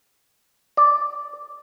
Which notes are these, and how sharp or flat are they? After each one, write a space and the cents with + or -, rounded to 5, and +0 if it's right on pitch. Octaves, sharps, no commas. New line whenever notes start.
D5 -5